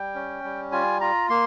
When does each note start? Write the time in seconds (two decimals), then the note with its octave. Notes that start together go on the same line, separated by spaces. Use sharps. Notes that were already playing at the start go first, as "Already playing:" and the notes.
Already playing: G3 G5
0.15 C#4
0.44 G3
0.72 F4 G#5
1.01 F4 A#5
1.29 A#3 C6